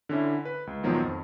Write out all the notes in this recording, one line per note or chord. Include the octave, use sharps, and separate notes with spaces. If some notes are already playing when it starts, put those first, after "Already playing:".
D3 C#4 E4
B4
C#2
A#2 D#3 F3 F#3 B3
F2